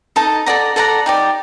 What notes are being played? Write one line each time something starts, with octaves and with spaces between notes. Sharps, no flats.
D#4 A4 D#5 A5
A4 D5 F#5 A#5
A4 D5 F#5 A#5
D#4 G4 D5